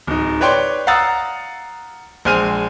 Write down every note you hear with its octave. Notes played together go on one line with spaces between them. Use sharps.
D1 D#4
B4 C#5 D5 G5 C6
F5 F#5 A#5 D#6 E6 A6
A#1 G#3 C5 G#5 F6 D#7